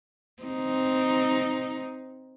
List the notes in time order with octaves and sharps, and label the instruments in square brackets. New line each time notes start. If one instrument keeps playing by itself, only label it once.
[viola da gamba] C4 D#4